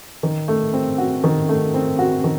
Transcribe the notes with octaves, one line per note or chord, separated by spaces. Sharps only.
D#3
A3
C4
F#4
D#3
A3
C4
F#4
D#3